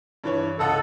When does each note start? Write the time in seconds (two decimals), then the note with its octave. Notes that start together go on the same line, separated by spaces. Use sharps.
0.24 G2 E3 C#5
0.59 C#2 A4 D#5 F#5